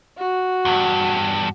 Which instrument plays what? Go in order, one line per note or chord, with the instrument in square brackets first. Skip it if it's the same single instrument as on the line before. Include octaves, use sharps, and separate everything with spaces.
[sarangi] F#4
[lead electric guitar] E2 G2